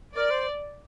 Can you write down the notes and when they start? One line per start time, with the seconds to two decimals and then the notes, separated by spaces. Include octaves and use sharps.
0.15 A#4 D5
0.30 C5